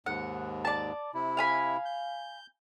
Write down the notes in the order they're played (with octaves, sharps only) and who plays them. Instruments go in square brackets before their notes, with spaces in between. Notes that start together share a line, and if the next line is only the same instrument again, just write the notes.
[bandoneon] D#2 G#2 [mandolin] F#5
[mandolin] D5 A5
[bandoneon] C3 E4
[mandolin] F5 G#5 B5
[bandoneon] G6